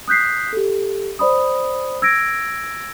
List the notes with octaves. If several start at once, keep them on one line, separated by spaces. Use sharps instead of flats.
D#6 F#6 G6 B6 C7
G4 A4
C5 D5 B5 D#6
E6 G#6 A#6 D7